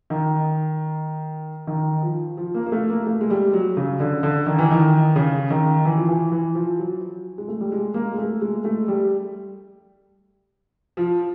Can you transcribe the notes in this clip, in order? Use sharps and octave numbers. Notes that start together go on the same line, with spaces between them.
D#3
D#3
F3
F3
A#3
A#3
A3
A#3
A3
G#3
G3
F#3
C#3
D3
D3
D#3
E3
D#3
C#3
D#3
E3
F3
E3
E3
F3
F#3
G#3
A3
G3
G#3
A#3
G#3
A3
G#3
A3
G3
F3